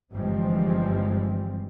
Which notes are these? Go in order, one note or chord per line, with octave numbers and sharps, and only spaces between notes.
G1 E3 F3 G3 G#3 C4